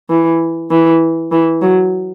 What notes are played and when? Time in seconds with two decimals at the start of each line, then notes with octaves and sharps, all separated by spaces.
0.10 E3
0.71 E3
1.32 E3
1.62 F#3